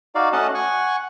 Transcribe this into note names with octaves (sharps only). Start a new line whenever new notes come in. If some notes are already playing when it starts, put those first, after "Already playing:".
D#4 F#4 D5 F5
A3 C#4 F#4 D#5 F#5 A5
F#5 G#5 C#6